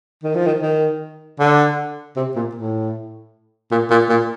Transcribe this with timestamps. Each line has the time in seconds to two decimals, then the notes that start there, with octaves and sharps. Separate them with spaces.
0.24 D#3
0.35 F3
0.46 D#3
0.62 D#3
1.40 D3
2.16 C3
2.36 A#2
2.55 A2
3.71 A#2
3.91 A#2
4.09 A#2